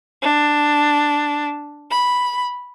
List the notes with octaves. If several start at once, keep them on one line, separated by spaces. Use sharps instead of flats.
D4
B5